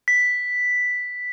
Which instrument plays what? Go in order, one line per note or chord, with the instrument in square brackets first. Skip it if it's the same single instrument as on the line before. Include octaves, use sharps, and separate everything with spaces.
[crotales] B6